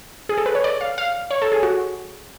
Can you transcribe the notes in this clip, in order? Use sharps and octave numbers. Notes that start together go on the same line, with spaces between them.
G#4
A4
B4
C#5
D5
F5
F5
C#5
A4
G#4
F#4